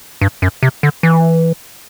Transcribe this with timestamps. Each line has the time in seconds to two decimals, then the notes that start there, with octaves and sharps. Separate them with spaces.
0.21 G2
0.42 F#2
0.63 C3
0.83 D3
1.03 E3